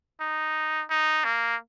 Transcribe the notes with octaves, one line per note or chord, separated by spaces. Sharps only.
D#4
D#4
A#3